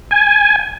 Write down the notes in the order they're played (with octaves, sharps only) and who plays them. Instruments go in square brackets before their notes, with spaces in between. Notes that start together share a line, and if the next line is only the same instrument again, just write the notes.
[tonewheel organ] G#5